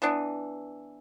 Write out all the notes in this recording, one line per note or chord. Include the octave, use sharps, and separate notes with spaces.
E3 B3 D4